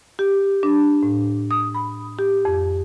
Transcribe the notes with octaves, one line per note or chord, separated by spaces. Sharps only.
G4
D4
A2
D#6
B5
G4
F2